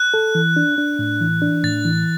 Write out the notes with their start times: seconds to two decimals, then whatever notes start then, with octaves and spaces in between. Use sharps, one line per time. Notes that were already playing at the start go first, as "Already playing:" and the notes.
Already playing: F#6
0.14 A4
0.35 E3
0.56 D4
0.78 D4
0.99 A2
1.21 E3
1.42 D4
1.64 A2 A6
1.85 E3